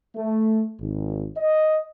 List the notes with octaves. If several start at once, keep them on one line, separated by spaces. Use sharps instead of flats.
A3
G#1
D#5